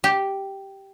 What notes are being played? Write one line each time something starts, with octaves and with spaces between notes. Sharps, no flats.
G4